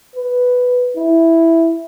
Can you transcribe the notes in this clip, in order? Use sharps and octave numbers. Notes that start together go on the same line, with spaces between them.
B4
E4